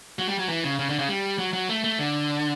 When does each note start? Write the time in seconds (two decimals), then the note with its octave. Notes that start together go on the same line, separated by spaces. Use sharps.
0.19 F#3
0.28 G3
0.39 F#3
0.49 E3
0.64 C#3
0.79 C#3
0.89 D3
0.99 C#3
1.09 G3
1.38 F#3
1.53 F#3
1.69 A3
1.84 A3
1.99 D3